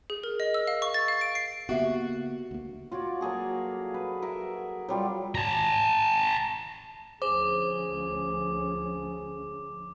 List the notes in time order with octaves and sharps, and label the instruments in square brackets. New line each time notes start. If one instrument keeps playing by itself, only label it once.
[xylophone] G#4
A#4
D#5
E6
F5
C#6
A6
F5
D7
C7
[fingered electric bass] C#3 A#3 B3 [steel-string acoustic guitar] F#4 [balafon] G4 E5
[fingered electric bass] D2 A#3
[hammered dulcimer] F4 F#4 C#5 D5
F#3 A#3 G#4 A4
B4
A#4 E5 F#5
F#3 G3 F4
[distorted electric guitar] A5 A#5
[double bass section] D2 F3 C#4 [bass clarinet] G#4 [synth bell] C5 E7 F7 [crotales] D6